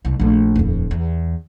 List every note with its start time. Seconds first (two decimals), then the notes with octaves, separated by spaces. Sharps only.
0.05 C2
0.20 A#1 A3
0.55 D#1 F2
0.91 E2